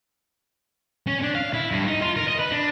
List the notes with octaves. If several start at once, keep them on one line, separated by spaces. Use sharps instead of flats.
C#4
D4
F5
E4
G2
D#4
F4
A#4
D#5
B4
D4